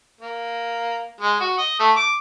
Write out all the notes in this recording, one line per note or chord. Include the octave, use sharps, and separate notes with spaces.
A#3
G#3
F#4
D#5
A3
D6